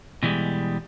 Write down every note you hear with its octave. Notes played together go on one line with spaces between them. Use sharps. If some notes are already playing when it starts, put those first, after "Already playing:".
B2 E3 G3 G#3